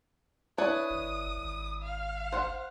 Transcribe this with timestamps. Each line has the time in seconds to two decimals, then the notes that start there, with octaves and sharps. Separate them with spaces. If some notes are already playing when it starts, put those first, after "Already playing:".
0.58 D4 E4 B4 C#5 D#6
0.91 G1
1.37 G#1
1.83 F5
2.32 C5 F#5